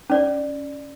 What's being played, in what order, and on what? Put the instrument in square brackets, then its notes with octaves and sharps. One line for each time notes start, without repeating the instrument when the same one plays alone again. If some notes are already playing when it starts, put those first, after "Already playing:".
[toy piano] C#4 D5